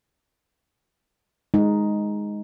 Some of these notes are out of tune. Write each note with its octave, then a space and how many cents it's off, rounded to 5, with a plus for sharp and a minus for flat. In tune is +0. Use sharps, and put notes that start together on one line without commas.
G#3 +0 D#4 +0